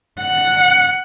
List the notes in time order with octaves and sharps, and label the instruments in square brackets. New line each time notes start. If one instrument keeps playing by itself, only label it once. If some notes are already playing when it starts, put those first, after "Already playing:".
[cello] F#5